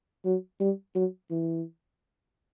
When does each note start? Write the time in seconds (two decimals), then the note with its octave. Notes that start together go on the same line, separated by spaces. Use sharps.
0.25 F#3
0.60 G3
0.95 F#3
1.31 E3